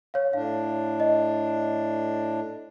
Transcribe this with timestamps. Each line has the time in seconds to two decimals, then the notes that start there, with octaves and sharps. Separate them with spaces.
0.14 C#5 F5
0.33 A2 D4 F5
1.00 D#5